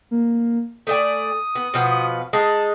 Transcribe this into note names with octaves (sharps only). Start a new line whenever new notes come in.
A#3
A3 D5 G#5 D#6
B3
B2 F3 B3
G#3 D#4 A5